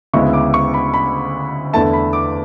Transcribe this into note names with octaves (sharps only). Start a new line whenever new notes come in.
D2 C#3 G#3 B3 E4 C#6
D6
C#6
B5
B5
E2 D3 A3 E4 A5
B5
D6